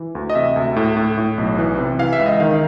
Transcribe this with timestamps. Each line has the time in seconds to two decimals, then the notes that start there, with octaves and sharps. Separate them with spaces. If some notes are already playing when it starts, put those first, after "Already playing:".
Already playing: E3
0.15 D2
0.30 D#5
0.35 C3 E5
0.56 D2
0.76 A2
0.97 A2
1.18 A2
1.38 B1
1.58 E3
1.78 C3
1.99 E3 F5
2.13 E5
2.19 C#2
2.26 D#5
2.40 D#3 F5